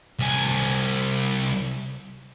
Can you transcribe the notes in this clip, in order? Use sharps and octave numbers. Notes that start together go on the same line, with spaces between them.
C2 G#5